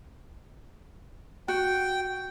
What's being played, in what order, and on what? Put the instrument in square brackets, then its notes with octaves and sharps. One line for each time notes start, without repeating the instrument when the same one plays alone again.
[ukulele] F#4 [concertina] G5